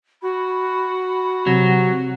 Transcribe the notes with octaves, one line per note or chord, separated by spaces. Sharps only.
F#4 B5
C3 F#3 F#5